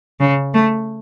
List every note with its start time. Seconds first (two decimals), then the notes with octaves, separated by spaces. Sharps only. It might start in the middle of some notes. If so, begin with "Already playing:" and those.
0.20 C#3
0.54 A3